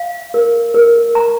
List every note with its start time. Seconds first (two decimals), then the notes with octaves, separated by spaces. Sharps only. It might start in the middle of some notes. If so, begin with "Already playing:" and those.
Already playing: F5
0.34 A#4
0.74 A#4
1.15 A#5